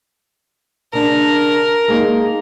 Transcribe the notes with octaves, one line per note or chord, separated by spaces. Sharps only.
C#3 D4 A#4
G#3 A#3 D#4